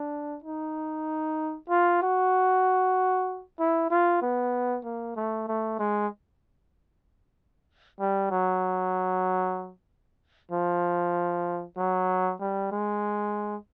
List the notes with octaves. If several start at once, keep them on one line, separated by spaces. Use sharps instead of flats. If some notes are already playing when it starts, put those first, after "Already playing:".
Already playing: D4
D#4
F4
F#4
E4
F4
B3
A#3
A3
A3
G#3
G3
F#3
F3
F#3
G3
G#3